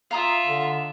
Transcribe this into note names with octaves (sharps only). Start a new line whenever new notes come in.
F4 E5 F5 A#5 D#6
D3